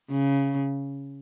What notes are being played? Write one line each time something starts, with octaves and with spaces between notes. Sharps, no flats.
C#3